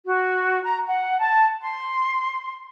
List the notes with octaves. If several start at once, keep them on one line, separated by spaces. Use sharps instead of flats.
F#4
A#5
F#5
A5
C6